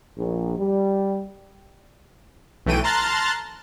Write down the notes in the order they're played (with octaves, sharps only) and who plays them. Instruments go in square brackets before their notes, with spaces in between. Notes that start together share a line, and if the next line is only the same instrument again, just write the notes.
[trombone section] A#1
G3
[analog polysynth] B1 E3 A3 G5 D#7
A5 A#5 C6 F6 F#6 A6